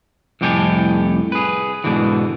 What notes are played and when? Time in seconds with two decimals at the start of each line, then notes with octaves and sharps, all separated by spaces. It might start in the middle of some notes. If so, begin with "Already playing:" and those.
0.41 C2 F2 A2 G4 A4 G#5
1.32 G#4 B4
1.84 G#2 B2 D3 E3